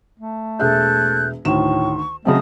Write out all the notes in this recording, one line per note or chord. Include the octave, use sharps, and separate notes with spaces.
A3
E1 G#4 A4 E5 F#6 G6
D2 A2 D#3 C#6 E7
C#3 F#3 A3 C4 D#5 D#6